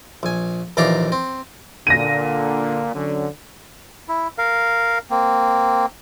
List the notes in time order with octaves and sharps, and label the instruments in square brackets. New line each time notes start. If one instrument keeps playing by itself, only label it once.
[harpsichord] A#1 G#5
A#1 D#2 E3 D5 F5 A#5
C4
[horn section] A#2 D3 [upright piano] A#6 D#7
[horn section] D3 F#3 C#4
[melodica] E4
A#4 F5
A#3 C4